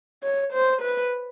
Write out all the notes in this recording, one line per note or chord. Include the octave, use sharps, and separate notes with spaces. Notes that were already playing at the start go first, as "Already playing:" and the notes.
C#5
C5
B4